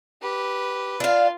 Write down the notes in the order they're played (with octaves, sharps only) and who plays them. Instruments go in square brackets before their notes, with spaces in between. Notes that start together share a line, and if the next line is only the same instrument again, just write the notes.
[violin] G4 B4
[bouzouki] D4 F5 [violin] F4